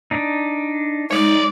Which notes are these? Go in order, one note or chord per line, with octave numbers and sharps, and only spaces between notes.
D4 D#4
G#3 D#4 C#5 D5